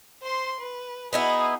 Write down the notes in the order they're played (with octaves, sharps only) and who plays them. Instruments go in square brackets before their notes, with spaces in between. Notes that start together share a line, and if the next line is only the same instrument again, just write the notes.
[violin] C5 C6
B4
[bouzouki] B3 D#4 E4 [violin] F#4 G#4